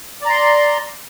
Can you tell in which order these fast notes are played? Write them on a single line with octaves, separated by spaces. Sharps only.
D5 A#5 C6